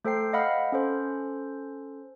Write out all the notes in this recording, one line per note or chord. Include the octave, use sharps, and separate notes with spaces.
A3 A4 C5 G5 C7
D#5 F5 F#5 B5 F6
C#4 A4 C5